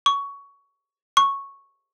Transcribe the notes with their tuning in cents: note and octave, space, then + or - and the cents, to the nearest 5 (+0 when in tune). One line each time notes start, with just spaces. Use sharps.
C#6 +15
C#6 -5